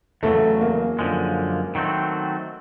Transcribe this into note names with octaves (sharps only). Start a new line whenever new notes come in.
E2 C#3 F#3 A3
A#3
F#2 D3 F3 G#3
D#3 F#3 A3 C4